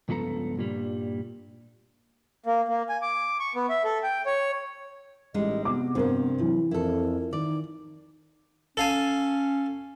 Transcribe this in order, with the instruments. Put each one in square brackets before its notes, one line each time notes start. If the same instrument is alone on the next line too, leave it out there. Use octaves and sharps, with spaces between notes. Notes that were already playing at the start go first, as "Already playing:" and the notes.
[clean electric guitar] C#2 G2 F3 B3 A4 A#5
G2 A#2 G3
[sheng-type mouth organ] A#3
A#3
G#5
D6
C#6
B3
E5
A4
G5
C#5
[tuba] A1 [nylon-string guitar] G3 G#3 D#4 [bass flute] D#5
[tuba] C3 [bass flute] B3 [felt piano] D6
[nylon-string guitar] G2 F3 [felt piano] C4 A#4
[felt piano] E3 [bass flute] F#3
[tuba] F2 [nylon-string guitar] E4 A4 [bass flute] A#4
[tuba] D#3 [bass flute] D#4 [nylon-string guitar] D5
[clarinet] C#4 [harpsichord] A4 F5 G#5